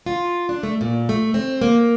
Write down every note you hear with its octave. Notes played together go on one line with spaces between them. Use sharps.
F4
D4
A3
A#2
A3
C4
A#3